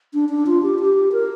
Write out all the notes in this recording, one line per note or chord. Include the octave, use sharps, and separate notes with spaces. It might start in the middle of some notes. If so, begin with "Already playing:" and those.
D4
D4
F4
G4
G4
A#4